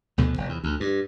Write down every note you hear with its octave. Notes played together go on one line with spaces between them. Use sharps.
D2 B2 D3 F3
F1
E2
D2
G2